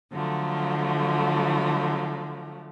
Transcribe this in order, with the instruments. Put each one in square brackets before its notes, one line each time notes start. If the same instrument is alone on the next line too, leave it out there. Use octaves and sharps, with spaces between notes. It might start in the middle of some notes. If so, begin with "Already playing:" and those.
[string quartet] D3 F3 F#3 A3